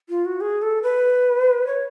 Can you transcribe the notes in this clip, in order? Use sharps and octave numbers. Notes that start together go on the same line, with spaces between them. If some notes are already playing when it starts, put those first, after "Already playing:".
F4
F#4
G#4
A4
B4
C#5